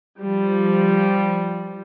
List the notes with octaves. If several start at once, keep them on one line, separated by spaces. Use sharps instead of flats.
F3 G3